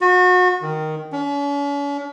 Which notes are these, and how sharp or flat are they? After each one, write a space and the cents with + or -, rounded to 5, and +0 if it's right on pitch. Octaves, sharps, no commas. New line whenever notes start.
F#4 -30
D#3 +0
C#4 +45